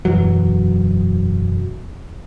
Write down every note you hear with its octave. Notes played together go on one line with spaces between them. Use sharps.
E1 F#2 E3 F#3